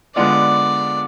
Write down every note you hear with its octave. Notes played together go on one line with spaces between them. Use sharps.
D3 G#3 B3 D4 F4 D5